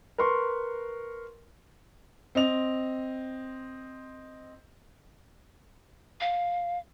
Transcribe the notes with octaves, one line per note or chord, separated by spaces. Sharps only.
A#4 B4 C6 C#6
C4 D#5 F7
F5